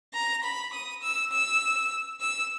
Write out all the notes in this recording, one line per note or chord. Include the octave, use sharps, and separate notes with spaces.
A#5
B5
D#6
E6
E6
E6